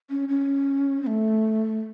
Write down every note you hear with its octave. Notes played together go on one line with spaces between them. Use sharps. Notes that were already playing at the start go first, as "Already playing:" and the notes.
C#4
C#4
C4
A3